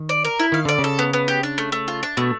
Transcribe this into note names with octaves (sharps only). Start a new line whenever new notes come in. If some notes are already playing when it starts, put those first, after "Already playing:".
Already playing: D#3
D5
A#4
E4
D#3 F5
D3 D5
C#3
A4
B3
B3
G4
D4
A3
A3
F4
D4
B2 A3